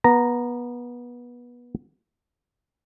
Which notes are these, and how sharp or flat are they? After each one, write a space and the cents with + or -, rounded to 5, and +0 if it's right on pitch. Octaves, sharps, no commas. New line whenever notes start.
B3 -25 A#5 +0